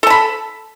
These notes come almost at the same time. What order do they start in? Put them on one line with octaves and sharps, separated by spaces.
A4 A5 B5